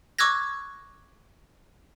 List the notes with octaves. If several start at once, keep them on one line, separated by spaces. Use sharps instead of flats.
C#6 D6 E6 F#6 G#6 A#6